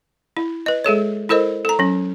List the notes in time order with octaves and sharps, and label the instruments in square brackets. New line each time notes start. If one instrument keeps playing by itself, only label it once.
[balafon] E4
B4 D#5
G#3 G#4 A4 C#5
E4 A4 A#4 C5 D#5
A4 A#5
F#3 C#4